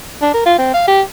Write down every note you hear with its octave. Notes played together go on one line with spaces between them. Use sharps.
D4
A#4
F4
C4
F5
G4